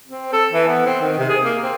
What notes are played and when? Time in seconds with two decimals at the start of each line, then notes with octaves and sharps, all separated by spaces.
0.08 C4
0.33 A4
0.52 E3
0.68 B3
0.86 C4
1.02 D#3
1.18 C3
1.30 G#4
1.44 A#3
1.63 C4